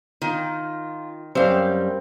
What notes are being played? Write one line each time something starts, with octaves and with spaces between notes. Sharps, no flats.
D#3 F4
F#2 G3 C4 C5 F5